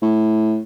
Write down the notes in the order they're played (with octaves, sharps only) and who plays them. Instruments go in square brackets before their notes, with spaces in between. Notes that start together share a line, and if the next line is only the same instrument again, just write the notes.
[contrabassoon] A2